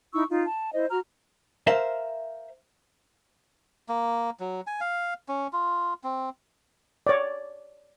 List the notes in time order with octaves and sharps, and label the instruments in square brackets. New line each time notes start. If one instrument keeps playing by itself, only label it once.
[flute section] D#4 E4 C#6 E6
D#4 F4
A5
E4 C5 D#5
F#4 A#5 F6
[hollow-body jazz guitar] A#4 C5 E5 F5
[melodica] A#3
F#3
G#5
F5
C#4
F4
C4
[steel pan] C#5 D5